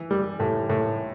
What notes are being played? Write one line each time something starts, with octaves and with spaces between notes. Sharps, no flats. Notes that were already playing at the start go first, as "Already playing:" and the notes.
Already playing: E3
G3
A2
A2